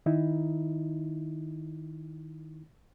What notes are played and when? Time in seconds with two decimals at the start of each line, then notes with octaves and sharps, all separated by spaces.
0.06 D#3 D#4 E4